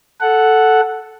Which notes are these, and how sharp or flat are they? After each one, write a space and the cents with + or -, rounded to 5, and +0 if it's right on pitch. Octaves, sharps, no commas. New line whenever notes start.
A4 +0 F#5 +0